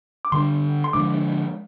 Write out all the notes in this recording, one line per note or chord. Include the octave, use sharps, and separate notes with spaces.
D6
D3 G3 D4 C6
C6
D3 F3 G#3 D4 D6